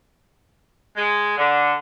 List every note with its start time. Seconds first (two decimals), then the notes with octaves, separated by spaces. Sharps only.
0.97 G#3
1.37 D3